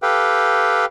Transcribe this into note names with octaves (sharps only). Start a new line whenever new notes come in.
G4 A4 B4 F5 G5